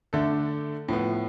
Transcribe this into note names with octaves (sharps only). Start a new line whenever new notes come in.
D3 A3 D4 A4
A2 F3 B3